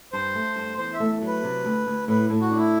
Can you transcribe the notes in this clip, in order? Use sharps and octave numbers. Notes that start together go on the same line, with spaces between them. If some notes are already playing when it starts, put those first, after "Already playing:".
G2 C5
A3
G2
E2 C5
E5
A3
F#3
B4
C3
D2
D2
A2 B4
A2
F#4
D4
E4